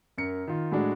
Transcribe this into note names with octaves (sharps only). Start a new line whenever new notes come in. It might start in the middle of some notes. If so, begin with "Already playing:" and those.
F#2 A#4 C#7
D#3 F4
A2 F#3 G#3 D4 F#4